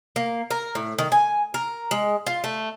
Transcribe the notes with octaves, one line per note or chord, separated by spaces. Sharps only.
A#3
A#4
A2
D#3
G#5
A#4
G#3
F4
A3